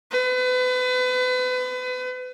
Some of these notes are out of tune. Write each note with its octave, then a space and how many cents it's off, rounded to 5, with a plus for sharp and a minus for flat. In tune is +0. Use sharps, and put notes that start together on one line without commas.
B4 +35